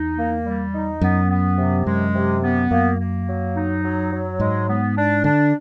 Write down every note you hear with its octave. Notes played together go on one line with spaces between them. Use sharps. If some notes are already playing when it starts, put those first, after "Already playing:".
Already playing: E2 D#4
A#3
G3
D#4
F#2 B3
B3
C3
F#2 G#3
C3
B3
F#2 A#3
A#3
F#3
D#4
F#3
F#3
G#2 G#3
B3
D4
D3 D4